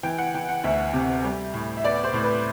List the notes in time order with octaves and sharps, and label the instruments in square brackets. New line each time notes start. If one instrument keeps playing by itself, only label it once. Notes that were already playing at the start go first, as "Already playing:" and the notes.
[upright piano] E3 G5
F#5
E3 G5
F#5
D2 E5
C3
G3
A2
E5
B3 D5
C5
A2
B4